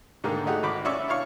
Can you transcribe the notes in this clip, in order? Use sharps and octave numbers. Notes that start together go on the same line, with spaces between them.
G#2 D3 D#3 A#3
G#3 A3 D#4 F#4 G4
G#1 B5 D6
C#4 D5 E5 C#6
D4 E4 C#5 F5 C#6